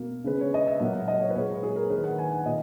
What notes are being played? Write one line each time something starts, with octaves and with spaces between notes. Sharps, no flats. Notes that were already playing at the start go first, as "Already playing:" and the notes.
Already playing: B2 A#3
C#3 G#3 B4
C#5
D#5
E5
A#2 F#3 A#3 F#5
F#5
D#5
C#5
B4
A#2 G#3 C#5
B4
G#4
A#4
D#3 G#3 B4
F#5
G#5
F#5
A#2 D#5